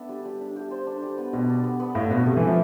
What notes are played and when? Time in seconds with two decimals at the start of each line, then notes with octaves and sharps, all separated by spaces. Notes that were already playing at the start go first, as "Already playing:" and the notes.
Already playing: B3 D4 A4 E5
0.09 G3
0.25 G3
0.41 D4
0.56 G4
0.71 C5
0.87 D4
1.03 G3
1.18 B3
1.33 B2 G3
1.49 D4
1.64 B3
1.80 B3
1.95 A2 F5
2.11 B2 B4
2.26 C3 A3
2.37 E3
2.41 E5
2.47 F3